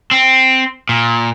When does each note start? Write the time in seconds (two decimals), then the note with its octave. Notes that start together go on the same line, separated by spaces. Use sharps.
0.11 C4
0.89 A#2